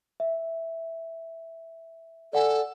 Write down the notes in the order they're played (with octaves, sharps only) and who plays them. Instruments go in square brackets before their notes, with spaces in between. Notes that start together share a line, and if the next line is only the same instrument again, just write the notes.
[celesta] E5
[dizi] A4 [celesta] D5 F#5 G#5